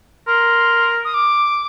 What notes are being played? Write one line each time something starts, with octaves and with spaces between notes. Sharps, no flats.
A#4 C6
D#6
D6